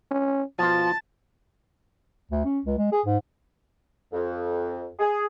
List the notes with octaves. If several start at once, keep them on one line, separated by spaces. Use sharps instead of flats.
C#4
B2 F3 F4 A5
D2
C#4
C#2
G#3
G#4
G#2
F2
G#4